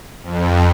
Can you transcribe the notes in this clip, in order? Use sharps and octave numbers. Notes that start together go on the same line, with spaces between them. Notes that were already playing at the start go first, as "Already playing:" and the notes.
F2